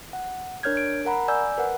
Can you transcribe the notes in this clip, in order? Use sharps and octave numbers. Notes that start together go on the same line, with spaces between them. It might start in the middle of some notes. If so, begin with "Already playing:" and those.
F#5
D4 A#4 C#5 F6 G6 G#6
D7
A#4 F#5 A#5 B5
D5 G#5 E6 G6
A#4 B4 F#5